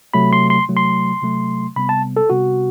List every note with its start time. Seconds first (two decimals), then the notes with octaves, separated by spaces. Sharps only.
0.14 C3 F#3 A3 B5
0.33 C6
0.50 C6
0.68 C3 F#3 A3
0.77 C6
1.22 C3 F#3 A3
1.76 C3 G3 B3 B5
1.89 A5
2.17 A4
2.30 C3 G3 B3 F#4